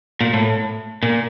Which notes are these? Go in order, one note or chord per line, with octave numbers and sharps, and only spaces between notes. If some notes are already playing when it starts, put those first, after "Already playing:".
A#2
A2
A#2